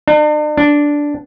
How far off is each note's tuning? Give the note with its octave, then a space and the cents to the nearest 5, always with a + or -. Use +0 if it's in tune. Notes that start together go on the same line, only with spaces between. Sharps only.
D4 +45
D4 -5